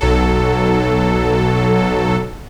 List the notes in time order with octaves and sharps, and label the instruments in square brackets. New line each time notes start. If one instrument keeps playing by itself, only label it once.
[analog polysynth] B1 F#3 A4